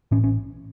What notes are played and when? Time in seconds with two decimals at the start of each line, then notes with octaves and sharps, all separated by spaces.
0.11 A1 A2 C#4
0.24 C#4